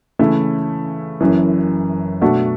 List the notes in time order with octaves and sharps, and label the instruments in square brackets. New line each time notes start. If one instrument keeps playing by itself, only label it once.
[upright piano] C#3 E3 A3 E4
F#1 F#2 E3
B2 A3 D4 F#4